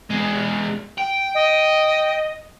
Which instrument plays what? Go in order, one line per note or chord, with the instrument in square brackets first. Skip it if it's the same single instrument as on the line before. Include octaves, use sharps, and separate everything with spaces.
[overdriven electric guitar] E2 G#3
G5
[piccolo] D#5